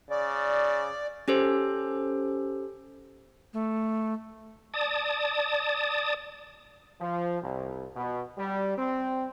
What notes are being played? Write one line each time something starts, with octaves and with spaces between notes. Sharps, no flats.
C#3 D5
C#4 G4 A4 C5
A3
D5 A5 D#6
F3
C2
B2
G3
C4